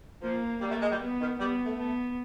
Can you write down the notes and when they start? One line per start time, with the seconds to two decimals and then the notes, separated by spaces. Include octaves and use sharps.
0.22 F3 A#3
0.61 G3 A#3
0.71 A3
0.81 G#3
0.91 G3
1.01 B3
1.19 D#3
1.39 G3 B3
1.65 A3
1.78 A3 B3